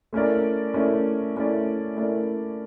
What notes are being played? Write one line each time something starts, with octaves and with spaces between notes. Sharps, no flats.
A3 C#4 E4 A#4 D5
A3 C#4 E4 A#4 D5
A3 C#4 E4 A#4 D5
A3 C#4 E4 A#4 D5